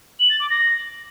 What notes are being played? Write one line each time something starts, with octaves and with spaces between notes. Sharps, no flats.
F#7
A6
D6
A#6